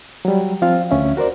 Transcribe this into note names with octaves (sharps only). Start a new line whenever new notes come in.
F#3 G3
F3 C4 F4 F5
D2 C#4 E5
F#4 A#4 C5 D5